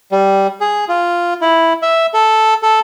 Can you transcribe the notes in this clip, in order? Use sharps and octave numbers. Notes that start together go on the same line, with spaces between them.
G3
G#4
F4
E4
E5
A4
A4